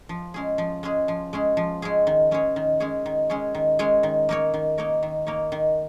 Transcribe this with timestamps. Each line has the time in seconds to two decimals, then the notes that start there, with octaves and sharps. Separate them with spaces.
0.09 F3
0.34 G#3 C#4 G#4
0.58 F3
0.83 G#3 C#4 G#4
1.08 F3
1.33 G#3 C#4 G#4
1.57 F3
1.82 G#3 C#4 G#4
2.07 D#3
2.31 G#3 C#4 G#4 C#5
2.56 D#3
2.80 G#3 C#4 G#4 C#5
3.06 D#3
3.29 G#3 C#4 G#4 C#5
3.54 D#3
3.79 G#3 C#4 G#4 C#5
4.03 D#3
4.29 A#3 D#4 A#4 C#5
4.54 D#3
4.78 A#3 D#4 A#4 C#5
5.03 D#3
5.26 A#3 D#4 A#4 C#5
5.52 D#3